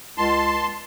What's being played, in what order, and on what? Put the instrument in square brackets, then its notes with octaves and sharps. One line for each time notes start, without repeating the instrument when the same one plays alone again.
[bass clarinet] C#2 [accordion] A5 C6